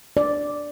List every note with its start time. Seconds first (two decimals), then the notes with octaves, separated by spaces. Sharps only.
0.17 D5